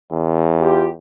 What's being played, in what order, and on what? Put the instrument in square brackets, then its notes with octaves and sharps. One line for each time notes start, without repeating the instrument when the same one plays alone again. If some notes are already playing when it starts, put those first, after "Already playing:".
[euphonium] E2
[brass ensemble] F4 G4